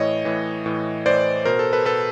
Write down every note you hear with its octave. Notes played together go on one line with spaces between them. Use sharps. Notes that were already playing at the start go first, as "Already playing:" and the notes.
Already playing: A2 E3 C#5 D#5
A2 E3
A2 E3
A2 E3 C5 D5
B2 A#4 C5
A4
A4 B4
B2 A4 B4